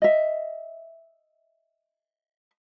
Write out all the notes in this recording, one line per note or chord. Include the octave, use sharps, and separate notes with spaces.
D#5 E5